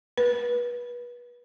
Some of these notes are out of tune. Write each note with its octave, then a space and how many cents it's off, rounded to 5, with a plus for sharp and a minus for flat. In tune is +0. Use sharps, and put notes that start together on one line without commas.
B4 -30